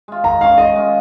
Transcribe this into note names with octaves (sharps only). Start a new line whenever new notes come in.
G#3 F4
D#3 A#5
G#3 C#4 F4 F5
D#3 D#5
G#3 C#4 F4